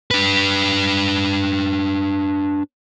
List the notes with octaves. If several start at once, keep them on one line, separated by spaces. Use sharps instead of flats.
D4 B4